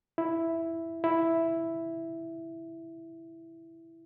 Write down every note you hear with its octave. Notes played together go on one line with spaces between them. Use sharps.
E4
E4